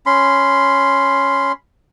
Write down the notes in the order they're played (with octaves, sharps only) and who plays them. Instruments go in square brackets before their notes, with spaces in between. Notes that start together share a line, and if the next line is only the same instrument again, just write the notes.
[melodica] C#4 B5 C6